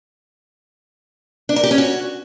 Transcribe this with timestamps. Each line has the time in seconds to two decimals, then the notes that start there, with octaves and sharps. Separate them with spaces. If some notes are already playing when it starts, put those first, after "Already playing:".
1.49 D4
1.56 A#4
1.64 G4
1.71 C#4
1.78 F#4